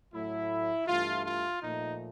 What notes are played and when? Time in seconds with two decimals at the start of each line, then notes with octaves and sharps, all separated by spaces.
0.13 A2 F#3 A3 E4
0.87 G2 E3 A3 F4
1.24 F4
1.61 A#2 F3 A3 D#4